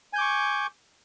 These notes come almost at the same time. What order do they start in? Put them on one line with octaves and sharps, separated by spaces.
G#5 G6 D6 C#6